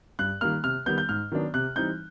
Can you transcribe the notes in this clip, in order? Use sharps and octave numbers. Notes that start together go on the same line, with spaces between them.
G2 F#6
D#3 G3 A#3 F6
C3 F6
D#3 G3 B3 G6
G6
G#2 F6
D#3 F#3 B3 D4
C3 F#6
E3 G3 C4 D#4 G6